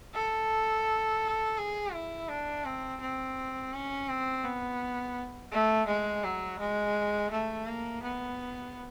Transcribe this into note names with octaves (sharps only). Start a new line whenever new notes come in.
A4
G#4
E4
D4
C4
C4
C#4
C4
B3
A3
G#3
F#3
G#3
A3
A#3
B3